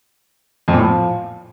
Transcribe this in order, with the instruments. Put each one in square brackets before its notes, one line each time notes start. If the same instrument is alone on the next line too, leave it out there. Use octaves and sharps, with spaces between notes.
[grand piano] F2
A#2
A2
F3